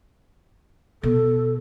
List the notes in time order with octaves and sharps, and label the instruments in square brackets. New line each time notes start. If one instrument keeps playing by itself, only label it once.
[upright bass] B2 [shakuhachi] A4